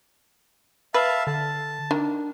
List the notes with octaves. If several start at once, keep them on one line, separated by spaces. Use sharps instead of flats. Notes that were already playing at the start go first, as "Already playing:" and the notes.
B4 E5 F5 A5
D3 A5
D#3 D4